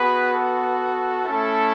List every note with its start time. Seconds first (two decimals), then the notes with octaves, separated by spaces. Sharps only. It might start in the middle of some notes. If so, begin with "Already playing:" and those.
Already playing: B3 F#4 G#4 B4
0.34 A4
1.25 A3 C#4 E4 A4